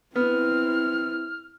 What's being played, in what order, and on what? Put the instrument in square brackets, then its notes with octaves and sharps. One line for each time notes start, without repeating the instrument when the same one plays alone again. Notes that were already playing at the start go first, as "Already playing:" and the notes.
[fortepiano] B3 [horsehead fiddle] C4 E4 [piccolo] F6